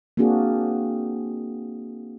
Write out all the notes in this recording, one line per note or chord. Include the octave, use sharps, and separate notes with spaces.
A#3 C4 D4 F#4 G#4